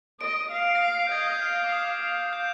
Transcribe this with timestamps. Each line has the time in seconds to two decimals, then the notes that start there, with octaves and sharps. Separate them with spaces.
0.20 D#5 D7
0.51 F5
0.75 A#6
0.82 C7
1.07 G6
1.11 D#5 G#6
1.27 G6
1.42 F5 F6
1.64 D6
1.72 D#6
2.02 F5
2.33 G6